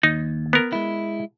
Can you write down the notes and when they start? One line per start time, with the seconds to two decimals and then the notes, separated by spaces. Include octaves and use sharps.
0.03 D#2 D#4
0.53 B3 A#4
0.73 G#3 E4